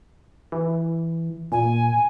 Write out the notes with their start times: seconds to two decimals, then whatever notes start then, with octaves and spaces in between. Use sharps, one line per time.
0.52 E3
1.52 A#2 G#5